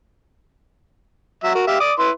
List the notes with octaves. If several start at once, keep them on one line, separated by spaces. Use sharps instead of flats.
F#3 E5
F#4 A#4
G4 E5 F5
D5 D6 D#6
E4 B4 C6